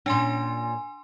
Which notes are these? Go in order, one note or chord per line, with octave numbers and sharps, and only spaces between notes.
A#2 C#4 D4 G#5 C6